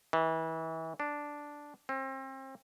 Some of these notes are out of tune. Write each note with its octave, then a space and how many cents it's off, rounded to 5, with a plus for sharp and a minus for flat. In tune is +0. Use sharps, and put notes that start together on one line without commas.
E3 -30
D4 -5
C4 +35